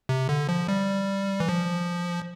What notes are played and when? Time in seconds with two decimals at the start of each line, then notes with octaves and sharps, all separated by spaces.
0.09 C3
0.29 D3
0.49 F3
0.68 G3
1.40 E3
1.49 F3